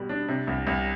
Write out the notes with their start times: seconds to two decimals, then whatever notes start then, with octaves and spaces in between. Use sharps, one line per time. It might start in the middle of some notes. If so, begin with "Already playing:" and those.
Already playing: B2 G3 B3
0.09 D4
0.28 C3
0.47 C2
0.67 C2